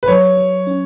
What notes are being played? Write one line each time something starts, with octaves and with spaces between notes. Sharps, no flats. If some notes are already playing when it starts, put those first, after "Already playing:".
B4
F#3 C#5
F#3
C#4